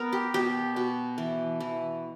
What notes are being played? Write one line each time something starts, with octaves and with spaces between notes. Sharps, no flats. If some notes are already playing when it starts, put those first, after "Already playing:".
Already playing: B3 A#4
G4
B2 G4
B2
E3
E3